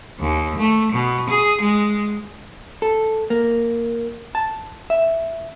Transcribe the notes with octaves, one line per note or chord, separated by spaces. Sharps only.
D#2
A3
B2
G#4
G#3
A4
A#3
A5
E5